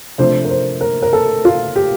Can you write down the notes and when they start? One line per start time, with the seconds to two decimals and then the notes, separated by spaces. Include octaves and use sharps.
0.18 C3 F3 A3 D4 C5
0.44 A#4
0.50 C5
0.81 A#4
1.02 A#4
1.13 A4
1.45 F4
1.76 G4